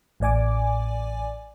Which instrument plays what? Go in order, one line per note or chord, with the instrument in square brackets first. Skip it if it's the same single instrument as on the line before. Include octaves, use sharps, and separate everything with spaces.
[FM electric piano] A1 A2 D5 G#5 D6